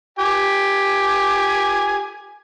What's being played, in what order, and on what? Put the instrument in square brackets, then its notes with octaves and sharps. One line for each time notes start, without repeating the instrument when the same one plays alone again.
[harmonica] G4 G#5